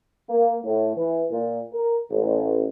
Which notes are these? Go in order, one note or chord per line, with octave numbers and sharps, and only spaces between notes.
A#3
A2
E3
A#2
A#4
A1